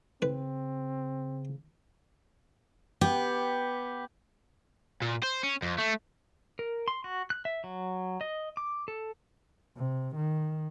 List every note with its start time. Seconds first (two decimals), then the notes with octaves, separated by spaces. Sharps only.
0.22 C#3 C4 B4
3.01 B3 G4
5.02 A#2
5.23 C5
5.43 C#4
5.62 F2
5.78 A3
6.59 A#4
6.88 C6
7.04 F#4
7.30 F#6
7.45 E5
7.64 F#3
8.21 D#5
8.57 D6
8.88 A4
9.77 C3
10.16 D#3